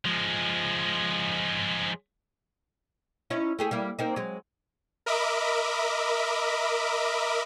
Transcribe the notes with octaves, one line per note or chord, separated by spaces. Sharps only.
F3 G#3
C#4 D#4 E4
A3 G4 G#4
G3 A#3 E4
A#3 C4 D#4
F#3 G#3
A#4 D#5 E5 B5 D6